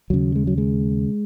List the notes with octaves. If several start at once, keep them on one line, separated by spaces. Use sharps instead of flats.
D#2 C#3 F#3
G#3
F#3
G#3